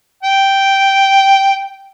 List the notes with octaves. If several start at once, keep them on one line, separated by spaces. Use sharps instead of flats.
G5